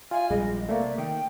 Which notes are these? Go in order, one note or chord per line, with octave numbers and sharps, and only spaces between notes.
F4 D5 E5 F5 G#5
A#1 G3 G#3 G#4 D#5
C3 A3 A#3 D5
D#3 G5